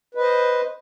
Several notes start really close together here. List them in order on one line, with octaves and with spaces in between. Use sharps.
B4 D#5 C5